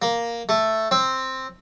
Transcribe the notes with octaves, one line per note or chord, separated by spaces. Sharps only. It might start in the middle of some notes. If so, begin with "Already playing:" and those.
A#3
A3
C4